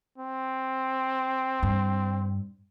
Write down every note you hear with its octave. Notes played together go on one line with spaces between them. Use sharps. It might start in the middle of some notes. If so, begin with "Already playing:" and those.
C4
G2